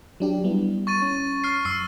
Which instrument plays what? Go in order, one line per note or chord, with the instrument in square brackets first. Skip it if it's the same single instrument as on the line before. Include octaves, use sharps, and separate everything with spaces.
[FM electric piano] F#3 D4 G4
G3 B3 E4
[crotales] C#6 A6 D#7
[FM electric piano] C#4
[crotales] F6 A6 C7
[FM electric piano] F#2 [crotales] C#6 E6 C7